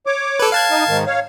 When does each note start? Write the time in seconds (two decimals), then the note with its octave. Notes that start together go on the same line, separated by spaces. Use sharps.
0.06 C#5 D6
0.40 A4 B4
0.52 F5 A5 F#6 G#6
0.71 D#4
0.88 G#2 D#3
1.07 C#5 F5